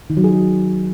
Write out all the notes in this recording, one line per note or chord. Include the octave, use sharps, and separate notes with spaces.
D#3
F#3
G#4